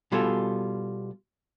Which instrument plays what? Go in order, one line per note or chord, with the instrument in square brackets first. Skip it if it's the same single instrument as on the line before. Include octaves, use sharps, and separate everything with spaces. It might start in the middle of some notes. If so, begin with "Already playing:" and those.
[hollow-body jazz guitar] B2 G3 F4 G#4 A4